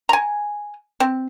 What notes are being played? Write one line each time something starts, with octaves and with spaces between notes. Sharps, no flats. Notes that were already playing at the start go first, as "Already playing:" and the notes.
G#5 A#5
C4